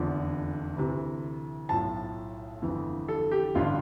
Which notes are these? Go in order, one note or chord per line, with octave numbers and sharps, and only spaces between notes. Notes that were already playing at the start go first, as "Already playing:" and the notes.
Already playing: F1 E2 D3 F3
D2 C3 E3
B1 A2 F3 A5
G1 F2 E3
A4
G4
A1 G2 D3 F3 F4